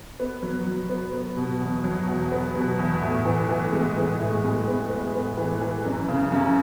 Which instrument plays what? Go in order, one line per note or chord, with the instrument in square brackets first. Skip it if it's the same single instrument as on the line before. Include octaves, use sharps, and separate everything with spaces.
[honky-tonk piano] B3
F#3
F#3
B3
B3
B2
E2
F#3
E2
B3
B2
E2
A2
E3
E3
G#3
E3
A2
G#3
B3
B3
B3
E3
E3
F#2
C#3
F#2